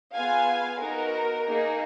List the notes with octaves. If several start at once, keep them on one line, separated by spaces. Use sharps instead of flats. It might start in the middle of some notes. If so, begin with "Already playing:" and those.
B3 F4 G#4 F5 G#5
B3 D#4 F#4 A#4
A#3 D#4 G#4